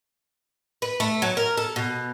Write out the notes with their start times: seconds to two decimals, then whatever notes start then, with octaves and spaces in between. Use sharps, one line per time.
0.82 B4
1.00 A3
1.22 F#3
1.37 A#4
1.57 A4
1.76 B2